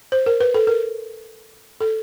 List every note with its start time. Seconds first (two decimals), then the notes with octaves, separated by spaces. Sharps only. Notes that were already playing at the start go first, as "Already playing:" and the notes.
0.12 C5
0.26 A#4
0.40 B4
0.54 A4
0.67 A#4
1.81 A4